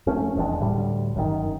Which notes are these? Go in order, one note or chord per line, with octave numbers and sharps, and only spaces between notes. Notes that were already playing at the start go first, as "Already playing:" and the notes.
F2 A3 C#4
D#1 E2 G#3 D4
D2 A2 G3
G1 F#2 A#2 D#3